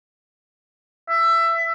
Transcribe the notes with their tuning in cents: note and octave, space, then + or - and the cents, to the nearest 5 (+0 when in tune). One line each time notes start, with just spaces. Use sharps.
E5 +15